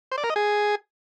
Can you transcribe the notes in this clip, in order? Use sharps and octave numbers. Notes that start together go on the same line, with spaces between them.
C5
D5
A#4
D#5
G#4